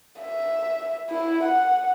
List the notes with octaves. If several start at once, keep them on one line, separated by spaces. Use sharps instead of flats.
E5
E4
F#5